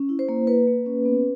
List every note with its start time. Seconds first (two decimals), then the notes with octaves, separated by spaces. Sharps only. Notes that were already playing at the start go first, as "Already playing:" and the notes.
Already playing: C#4
0.09 E4
0.19 C5
0.29 A#3
0.47 A#3 B4
0.67 A#3
0.86 C#4
1.06 B3